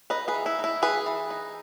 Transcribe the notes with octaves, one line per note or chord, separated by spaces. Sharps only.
D#4 B4 D#5
G#4 B4
E3
E4
D#4
E4
E3 G#4 B4
E3
D#4